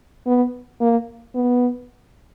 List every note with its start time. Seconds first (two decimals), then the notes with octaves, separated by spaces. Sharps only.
0.27 B3
0.81 A#3
1.35 B3